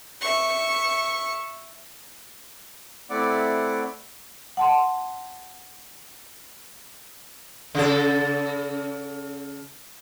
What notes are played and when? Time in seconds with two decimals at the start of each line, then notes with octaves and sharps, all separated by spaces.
0.21 E5 C#6
3.10 A3 C4 E4 D5 F#5 D6
4.57 F#5 A5 C6
7.75 C#3 A4